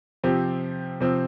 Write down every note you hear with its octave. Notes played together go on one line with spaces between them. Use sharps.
C3 F3 C4 G4
C3 F3 C4